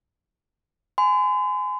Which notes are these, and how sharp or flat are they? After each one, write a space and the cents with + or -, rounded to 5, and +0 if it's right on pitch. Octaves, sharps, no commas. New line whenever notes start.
G#5 +10 C6 -45